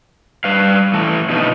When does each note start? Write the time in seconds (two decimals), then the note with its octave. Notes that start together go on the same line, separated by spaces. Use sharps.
0.44 G3 B4 F5
0.94 E3 A3
1.29 B2 F3 A3 B3 D4 D#4